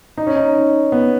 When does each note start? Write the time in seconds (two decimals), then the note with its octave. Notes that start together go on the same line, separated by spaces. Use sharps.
0.17 D#4
0.27 C#4
0.36 D#4
0.92 B3